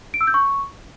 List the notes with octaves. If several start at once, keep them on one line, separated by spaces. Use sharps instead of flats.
D7
E6
G6
C#6